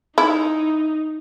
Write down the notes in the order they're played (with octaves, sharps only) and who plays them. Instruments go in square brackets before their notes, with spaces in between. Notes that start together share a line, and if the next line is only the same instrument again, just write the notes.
[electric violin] D#4 [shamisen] E4